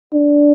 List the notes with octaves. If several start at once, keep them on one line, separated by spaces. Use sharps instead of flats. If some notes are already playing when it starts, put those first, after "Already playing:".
D4